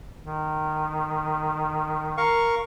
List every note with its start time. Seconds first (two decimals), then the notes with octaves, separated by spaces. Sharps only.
0.21 D#3
2.17 A#4 F5 C#6